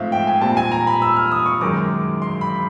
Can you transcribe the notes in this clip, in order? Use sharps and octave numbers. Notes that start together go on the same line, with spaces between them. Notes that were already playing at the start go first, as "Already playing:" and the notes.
Already playing: G#2 F3 A3 C4 E5 F5
G5
G#5
A#2 G3 C4 A5
G#5
A#5
B5
E6
F6
D#6
C#6
F#2 D#3 G#3 D6
C6
B5